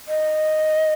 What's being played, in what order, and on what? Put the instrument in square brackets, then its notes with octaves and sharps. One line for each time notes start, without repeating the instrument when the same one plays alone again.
[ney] D#5